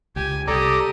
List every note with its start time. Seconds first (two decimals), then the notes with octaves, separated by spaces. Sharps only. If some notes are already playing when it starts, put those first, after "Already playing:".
0.16 C#2 G4 G#5
0.48 C2 G4 A4 D5 A#5 D#6